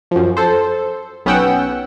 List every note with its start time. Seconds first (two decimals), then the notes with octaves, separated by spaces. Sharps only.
0.11 F#2 F3
0.37 A4 C5
1.25 B1 B3 C#4 F#5 G5 E6